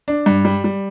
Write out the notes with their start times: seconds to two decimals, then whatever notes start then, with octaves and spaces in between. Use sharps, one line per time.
0.08 D4
0.26 G2
0.45 G3
0.64 G3